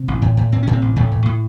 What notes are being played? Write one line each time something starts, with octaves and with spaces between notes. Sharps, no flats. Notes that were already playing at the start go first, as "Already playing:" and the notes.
Already playing: C3 C4
A1
A2
A2
A2 C4
A2 C#4
C3 C4
A1
A1 A2 A3
A2
A2